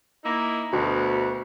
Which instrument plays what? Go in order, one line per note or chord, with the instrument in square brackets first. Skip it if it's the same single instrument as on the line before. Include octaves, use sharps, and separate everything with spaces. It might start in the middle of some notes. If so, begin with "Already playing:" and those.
[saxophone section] A#3 D#4 E4
[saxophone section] D2 B2 [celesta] F#4